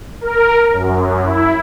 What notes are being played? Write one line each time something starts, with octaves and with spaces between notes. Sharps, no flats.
A#4
F#2
E4